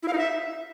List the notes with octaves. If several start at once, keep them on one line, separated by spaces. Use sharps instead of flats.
E4
F5
D#4
E5